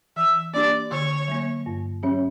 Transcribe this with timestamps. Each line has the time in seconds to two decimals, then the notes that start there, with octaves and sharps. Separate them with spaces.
0.16 E3 E5
0.54 A#3 D4 G4 D5
0.91 D3 C#5
1.28 F#3 A#3
1.66 G2
2.03 F#3 C#4 G4 C#5